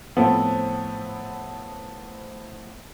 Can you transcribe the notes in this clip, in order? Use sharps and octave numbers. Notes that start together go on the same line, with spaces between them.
A2 F3 B3 C4 A4